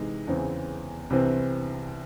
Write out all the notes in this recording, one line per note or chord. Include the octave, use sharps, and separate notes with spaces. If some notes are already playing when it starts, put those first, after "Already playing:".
Already playing: C3 E3 G#3 D#4
E2 C#3 E3 C4
C2 C3 E3 C4